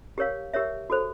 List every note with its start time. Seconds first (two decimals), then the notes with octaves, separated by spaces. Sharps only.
0.18 G4 A#4 C#5 F5
0.54 G4 A#4 C#5 E5
0.90 F#4 A4 C5